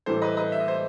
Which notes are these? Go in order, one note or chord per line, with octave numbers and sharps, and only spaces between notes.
A2 E3 G3 A4 C5
B4 D#5
B4 D#5
E5
D#5
C5